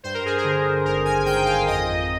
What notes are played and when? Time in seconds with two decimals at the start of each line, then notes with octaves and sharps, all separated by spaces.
0.03 G2 C5
0.14 A#4
0.26 G#4
0.38 A#4
0.44 D3
0.85 G#1 A#4
1.05 G#5
1.26 G#1 G5
1.45 F5
1.67 F2 D#5